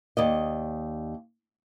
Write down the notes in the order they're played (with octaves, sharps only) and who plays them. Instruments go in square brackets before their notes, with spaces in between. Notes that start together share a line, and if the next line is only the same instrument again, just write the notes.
[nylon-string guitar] D#2 D5 D#5